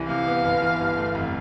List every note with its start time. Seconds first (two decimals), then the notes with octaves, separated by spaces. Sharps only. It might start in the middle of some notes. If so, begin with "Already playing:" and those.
Already playing: C2 E3
0.08 C3 F5
0.27 B3
0.44 G1
0.62 E3
0.80 G2
0.97 A3
1.15 F1